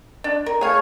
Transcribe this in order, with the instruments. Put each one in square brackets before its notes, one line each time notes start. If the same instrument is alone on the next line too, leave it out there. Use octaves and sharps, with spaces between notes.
[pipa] D4
A#4
[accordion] A3 C#5 [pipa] G#4 F5